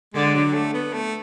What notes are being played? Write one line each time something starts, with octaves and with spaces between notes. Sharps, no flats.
D3 G#3
F#3
A3
B3
A3